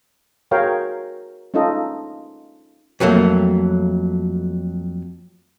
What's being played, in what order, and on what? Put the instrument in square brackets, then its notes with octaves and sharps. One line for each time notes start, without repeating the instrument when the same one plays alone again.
[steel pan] F#4 G#4 A#4 C#5 F5 G5
C#4 D#4 F4 A4 D#5
[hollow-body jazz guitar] F2 F#3 A3 A#3